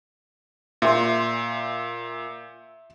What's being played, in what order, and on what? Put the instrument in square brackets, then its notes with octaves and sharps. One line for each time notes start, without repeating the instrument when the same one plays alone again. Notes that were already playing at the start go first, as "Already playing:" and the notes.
[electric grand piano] A#2 [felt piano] E5 C6